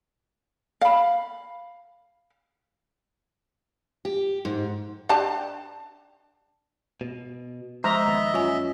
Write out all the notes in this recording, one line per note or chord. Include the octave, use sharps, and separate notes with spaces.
F5 B5
G4
G#2
D4 G4 A5
B2
F3 G#3 C5 D#5 E5 A#5
D#2 B3
F#2 F4 C#5 G#5